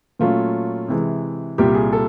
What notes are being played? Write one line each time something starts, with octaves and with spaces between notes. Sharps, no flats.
A#2 F#3 A3 C#4 F4
C3 E3 G#3
C2 A#2 G3 G4
G#4
A4